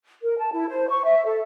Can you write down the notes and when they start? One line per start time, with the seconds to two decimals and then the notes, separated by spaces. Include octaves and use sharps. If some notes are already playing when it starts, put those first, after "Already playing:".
0.23 A#4
0.38 A5
0.52 E4
0.69 C5
0.89 C#6
1.05 E5
1.25 A4